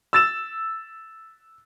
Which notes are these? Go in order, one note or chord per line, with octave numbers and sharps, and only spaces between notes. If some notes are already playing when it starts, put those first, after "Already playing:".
E6 A6 E7